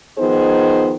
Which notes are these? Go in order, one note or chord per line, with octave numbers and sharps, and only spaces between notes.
D#3 F3 B3 D#4 G#4 C5